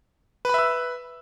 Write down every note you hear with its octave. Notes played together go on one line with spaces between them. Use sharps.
B4 E5 B5 E6